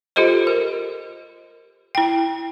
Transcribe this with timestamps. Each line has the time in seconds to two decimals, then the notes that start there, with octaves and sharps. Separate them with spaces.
0.16 F4 G4 A4 C5 D#5
0.47 A#4
1.95 E4 G5